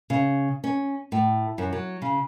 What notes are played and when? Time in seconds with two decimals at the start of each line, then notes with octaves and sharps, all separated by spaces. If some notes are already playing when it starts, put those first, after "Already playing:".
0.10 C#3
0.64 C#4
1.12 A2
1.58 F#2
1.73 F#3
2.02 C#3